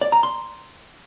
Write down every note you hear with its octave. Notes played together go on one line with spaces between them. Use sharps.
D5
A#5
C6